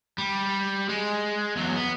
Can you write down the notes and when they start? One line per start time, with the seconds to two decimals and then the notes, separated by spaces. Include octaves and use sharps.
0.18 G3
0.89 G#3
1.56 E2 F#3
1.76 B3